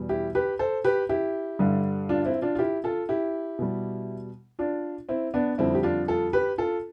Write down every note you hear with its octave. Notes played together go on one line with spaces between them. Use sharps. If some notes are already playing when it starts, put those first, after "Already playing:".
Already playing: E2 B2 G3
E4 G4
G4 B4
A4 C5
G4 B4
E4 G4
G2 D3 G3
D4 F4
C4 E4
D4 F4
F4
E4 G4
F4 A4
E4 G4
B2 G3
D4 F4
C4 E4
B3 D4
F2 D3 G3 C4 E4
G4
D4 F4
F4 A4
G4 B4
F4 A4